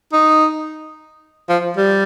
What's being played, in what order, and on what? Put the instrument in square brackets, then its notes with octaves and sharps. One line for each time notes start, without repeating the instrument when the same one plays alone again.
[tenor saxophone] D#4
F3
G3